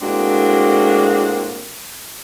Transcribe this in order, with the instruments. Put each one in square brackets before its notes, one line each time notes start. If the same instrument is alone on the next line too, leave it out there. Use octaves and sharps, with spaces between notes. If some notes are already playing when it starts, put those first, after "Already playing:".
[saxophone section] A2 G#3 A#3 C4 D4 F#4